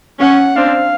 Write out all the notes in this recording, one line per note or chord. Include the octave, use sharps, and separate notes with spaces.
C#4 F#5
C4 D4 F5